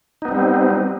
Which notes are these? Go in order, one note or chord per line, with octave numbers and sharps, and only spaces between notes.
G3 B3 C4 D#4